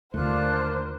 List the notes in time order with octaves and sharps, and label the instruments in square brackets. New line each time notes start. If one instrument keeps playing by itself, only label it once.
[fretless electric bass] D#2 [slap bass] D3 A3 [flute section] D4 F4 F#6 [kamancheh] A#4 C5